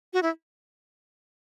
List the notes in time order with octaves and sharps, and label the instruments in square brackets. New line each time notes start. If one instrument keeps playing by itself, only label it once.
[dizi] F#4
E4